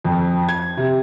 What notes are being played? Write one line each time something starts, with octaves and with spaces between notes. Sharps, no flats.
F2
G#6
C3